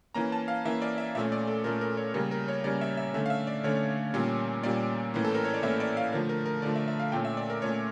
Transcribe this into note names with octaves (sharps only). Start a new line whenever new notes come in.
E3 A#3 C#4 A#5
A5
F5
E3 A#3 C#4 E5
D5
E5
A#2 A3 C#4 E5
D5
A4
A#2 A3 C#4 A#4
A#4
C#5
C#3 G3 A#3 C#4 A#4
A#4
C#5
C#3 G3 A#3 C#4 D5
E5
E5
D3 A3 C#4 E5
F5
E5
D5
D3 A3 C#4 C#5
A#2 G3 A#3 C#4
A#2 G3 A#3 C#4 D5
A2 E3 A#3 C#4
A4
A#4
C#5
D5
A2 E3 A#3 C#4 E5
D5
F5
D3 F3 A3 A#4
A#4
A#4
D3 F3 A3 D5
E5
E5
F5
A#2 A3 C#4 G5
E5
D5
A#4
A#2 A3 C#4 C#5